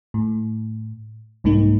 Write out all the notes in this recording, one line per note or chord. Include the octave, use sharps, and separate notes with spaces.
A2
C2 G#2 A#3 D#4